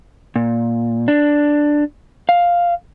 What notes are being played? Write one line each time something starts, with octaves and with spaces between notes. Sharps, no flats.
A#2
D4
F5